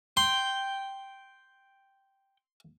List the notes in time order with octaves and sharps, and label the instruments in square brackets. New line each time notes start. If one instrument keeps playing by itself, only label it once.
[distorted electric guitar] G5 [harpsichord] C6